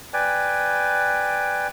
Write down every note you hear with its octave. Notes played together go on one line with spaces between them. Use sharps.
B4 D5 G5 G#5